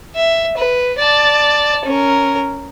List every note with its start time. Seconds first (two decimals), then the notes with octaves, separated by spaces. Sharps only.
0.16 E5
0.57 B4
0.98 D5 A5
1.85 C#4 A#4